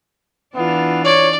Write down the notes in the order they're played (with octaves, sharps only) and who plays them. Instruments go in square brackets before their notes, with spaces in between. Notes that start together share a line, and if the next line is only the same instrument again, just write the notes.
[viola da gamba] E3 D4 F4 [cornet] B3
[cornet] C#5 [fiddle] D5